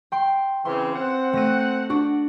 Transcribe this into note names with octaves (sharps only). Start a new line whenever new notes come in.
G5 C6
C#3 E3 C4 C6
C4 F#5
A3 A#6 D#7
D4 F#4